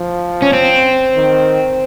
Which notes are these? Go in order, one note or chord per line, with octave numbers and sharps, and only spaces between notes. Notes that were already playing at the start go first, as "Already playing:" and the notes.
Already playing: F3
C#4
C4
D#3